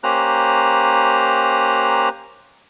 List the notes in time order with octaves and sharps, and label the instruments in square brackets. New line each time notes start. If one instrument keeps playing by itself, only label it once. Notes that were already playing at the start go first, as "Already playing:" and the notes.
[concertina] A#3 C#4 G4 C5 A#5 F#6